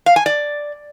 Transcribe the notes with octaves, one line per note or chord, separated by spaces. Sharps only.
F5
G#5
D5